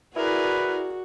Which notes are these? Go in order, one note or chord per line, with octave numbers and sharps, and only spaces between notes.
E4 F#4 G#4 A#4 B4 D5